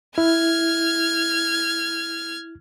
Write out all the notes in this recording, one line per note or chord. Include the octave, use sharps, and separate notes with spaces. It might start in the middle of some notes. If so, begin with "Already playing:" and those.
E4 F6 G#6